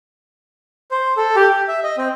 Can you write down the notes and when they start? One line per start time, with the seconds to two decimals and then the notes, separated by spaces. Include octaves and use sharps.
0.91 C5
1.17 A4
1.36 G4
1.50 G4
1.68 E5
1.84 D#5
1.98 C4